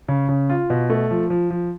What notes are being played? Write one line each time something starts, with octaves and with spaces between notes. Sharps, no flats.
C#3
C#3
F4
B2
A3
F3
F3
F3